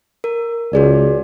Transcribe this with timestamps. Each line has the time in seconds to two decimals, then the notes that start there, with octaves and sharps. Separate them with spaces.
0.24 A#4
0.73 C#2 F#4 G#4 D5